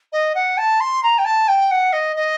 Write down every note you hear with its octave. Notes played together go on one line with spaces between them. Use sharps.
D#5
F#5
A5
C6
A#5
G5
A5
G5
F#5
D#5
D#5